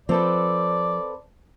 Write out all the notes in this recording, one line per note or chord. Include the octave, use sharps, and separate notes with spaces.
F3 C4 A4 B4 D5